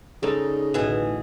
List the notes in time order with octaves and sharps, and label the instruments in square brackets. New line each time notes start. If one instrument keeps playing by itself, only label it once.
[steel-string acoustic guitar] G#2 [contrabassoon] C#3 [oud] D#4 A4 D5
[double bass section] A1 D2 [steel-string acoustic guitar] B2 E3 G#4